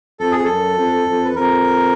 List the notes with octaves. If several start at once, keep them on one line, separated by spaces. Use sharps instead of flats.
F2 A4
G#4
F#2 A4
F2
F2
B4
F2 A#4